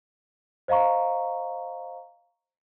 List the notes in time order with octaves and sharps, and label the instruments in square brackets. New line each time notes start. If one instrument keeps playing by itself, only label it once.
[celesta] C5 D#5 F5 A#5 C#6